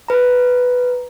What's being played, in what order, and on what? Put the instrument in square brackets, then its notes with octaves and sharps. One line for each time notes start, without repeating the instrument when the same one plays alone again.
[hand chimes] B4 A#5